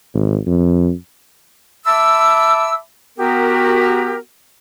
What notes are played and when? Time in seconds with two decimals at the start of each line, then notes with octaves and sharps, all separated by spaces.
0.14 G#1
0.47 F2
1.86 E5 A5 B5 D6 E6
3.19 B3 F#4 G4 A#4